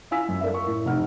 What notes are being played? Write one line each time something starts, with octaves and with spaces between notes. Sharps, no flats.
E4 F5 G#5 E6 B6
F#2
A4 A#4 D5 E5
A#4 C#6
A2
F1 D#4 F#5 F6